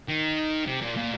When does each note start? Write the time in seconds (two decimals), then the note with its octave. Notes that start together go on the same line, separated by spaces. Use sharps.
0.08 D#3
0.67 C3
0.82 A#2
0.97 A#2